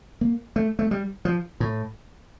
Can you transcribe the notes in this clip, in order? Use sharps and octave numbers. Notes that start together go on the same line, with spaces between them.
A#3
A3
A3
G3
F3
A2